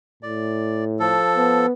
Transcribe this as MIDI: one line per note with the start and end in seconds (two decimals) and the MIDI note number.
0.23 1.21 45
0.23 0.85 74
1.00 1.66 53
1.00 1.66 69
1.37 1.72 59